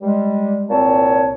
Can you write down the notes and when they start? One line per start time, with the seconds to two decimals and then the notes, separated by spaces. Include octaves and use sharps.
0.02 G3 G#3
0.70 C2 A#2 C4 C#5 A5